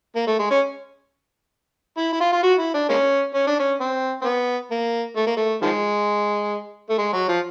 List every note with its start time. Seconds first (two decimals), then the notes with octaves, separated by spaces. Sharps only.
0.15 A#3
0.27 A3
0.39 G#3
0.51 C#4
1.97 E4
2.13 E4
2.20 F4
2.32 F4
2.43 F#4
2.59 E4
2.74 D4
2.89 G#3 A#3 C#4
3.34 C#4
3.47 D4
3.59 C#4
3.80 C4
4.21 C4
4.25 B3
4.71 A#3
5.16 A3
5.27 A#3
5.37 A3
5.62 D#3 F3 G#3
6.90 A3
6.98 G#3
7.13 F#3
7.28 F3